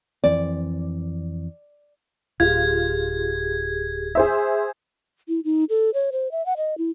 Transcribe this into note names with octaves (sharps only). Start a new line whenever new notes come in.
F2 E3 C4 D5
D1 F4 G4 G#4 G#6
G#4 C5 E5
E4
D#4
A4
C#5
C5
E5
F#5
D#5
E4